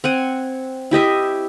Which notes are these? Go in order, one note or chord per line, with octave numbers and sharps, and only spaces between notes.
C4 F#5 G#5
E4 G4 D#5 E5